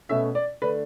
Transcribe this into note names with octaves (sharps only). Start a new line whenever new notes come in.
B2 A3 C#4 E5
D5
D3 A3 D4 B4